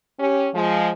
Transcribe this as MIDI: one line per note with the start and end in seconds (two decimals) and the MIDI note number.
0.20 0.48 61
0.20 0.48 67
0.55 0.91 53
0.55 0.91 56